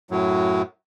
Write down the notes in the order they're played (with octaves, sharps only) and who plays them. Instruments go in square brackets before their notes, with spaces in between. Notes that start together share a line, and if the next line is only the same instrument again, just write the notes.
[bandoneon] F#2 A2 F#3